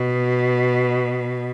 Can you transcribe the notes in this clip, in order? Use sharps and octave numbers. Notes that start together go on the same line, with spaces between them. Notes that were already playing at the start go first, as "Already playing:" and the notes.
Already playing: B2